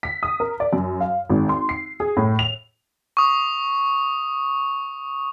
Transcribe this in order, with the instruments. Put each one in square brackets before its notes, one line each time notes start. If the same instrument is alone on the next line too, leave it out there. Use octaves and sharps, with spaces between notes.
[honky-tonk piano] B6
D#6
A#4
D5
F#2
F5
G#1
C6
C7
G#4
A2
F7
[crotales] C#6 D#6